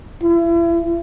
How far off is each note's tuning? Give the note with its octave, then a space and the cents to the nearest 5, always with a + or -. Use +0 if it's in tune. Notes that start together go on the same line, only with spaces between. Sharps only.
E4 +35